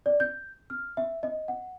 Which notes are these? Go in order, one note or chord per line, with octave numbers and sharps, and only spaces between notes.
D5
G6
F6
E5
D#5
F#5